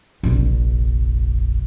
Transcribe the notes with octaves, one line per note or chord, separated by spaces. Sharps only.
F1 A#1